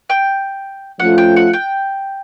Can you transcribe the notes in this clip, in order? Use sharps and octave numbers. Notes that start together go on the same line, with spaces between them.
G5
F3 A3 C#4 F4 A4 F#5
G5
F#5
G5